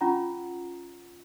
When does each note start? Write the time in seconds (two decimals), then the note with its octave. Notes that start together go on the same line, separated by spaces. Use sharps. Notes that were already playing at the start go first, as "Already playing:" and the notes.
0.01 C#4 F4 F#5 A#5 C#6